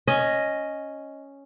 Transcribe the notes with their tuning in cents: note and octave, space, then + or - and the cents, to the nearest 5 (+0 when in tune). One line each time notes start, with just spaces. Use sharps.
C#4 +0 D#5 +0